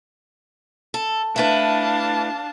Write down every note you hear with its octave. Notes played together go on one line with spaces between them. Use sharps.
A4
A3 D4 E4 B4 F5 A5